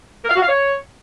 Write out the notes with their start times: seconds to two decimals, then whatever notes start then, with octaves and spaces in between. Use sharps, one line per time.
0.23 A#4
0.29 F5
0.35 F#4
0.41 F5
0.47 C#5